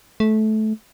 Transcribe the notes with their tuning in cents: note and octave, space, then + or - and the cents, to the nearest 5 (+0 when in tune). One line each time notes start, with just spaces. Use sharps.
A3 -20